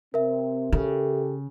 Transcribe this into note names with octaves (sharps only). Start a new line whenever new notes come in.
C3 C4 A#4 E5
C#3 G4 A4